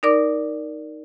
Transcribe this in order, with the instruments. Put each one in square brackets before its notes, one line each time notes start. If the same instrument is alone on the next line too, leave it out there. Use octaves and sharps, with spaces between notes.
[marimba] D#4 A#4 D5 D6